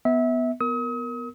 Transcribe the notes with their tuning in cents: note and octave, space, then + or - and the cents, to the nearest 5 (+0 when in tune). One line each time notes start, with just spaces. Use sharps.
B3 +0 E5 -25
B3 +0 A#4 +0 D#6 +40